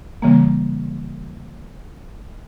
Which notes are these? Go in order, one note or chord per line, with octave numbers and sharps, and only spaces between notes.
C#3 E3 G3 A#3